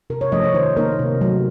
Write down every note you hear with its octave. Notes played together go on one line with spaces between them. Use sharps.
C3 A#4
C#5
F3 A3 C#4 D#5
C#5
D#3 C5
A#3 D#4 A#4
C3
F#3 A3